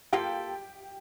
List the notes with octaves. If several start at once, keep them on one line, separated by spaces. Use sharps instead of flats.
A#3 F4 G4 A4 G5